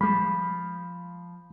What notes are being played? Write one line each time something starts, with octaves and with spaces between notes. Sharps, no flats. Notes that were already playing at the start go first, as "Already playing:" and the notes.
F3 G3 G#3 B5